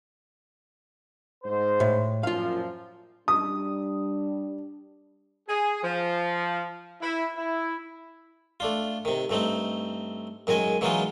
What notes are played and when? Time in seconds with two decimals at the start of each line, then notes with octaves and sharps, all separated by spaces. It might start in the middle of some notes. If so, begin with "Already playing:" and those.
1.43 G#2 C5
1.80 A2
2.23 F#2 A#2 F3 F4 F5
3.28 G3 D4 D#6
5.48 G#4
5.82 F3
7.02 E4
7.36 E4
8.60 A3 D4 F4
9.05 C3 D#3
9.30 G2 A3 C4 D#4
10.47 F#2 D#3 G#3 D#5 G#5
10.81 E3 F#3 G#3 B3 D#4 F4